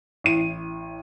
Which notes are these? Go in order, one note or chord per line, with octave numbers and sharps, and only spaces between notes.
A1 A2 D#7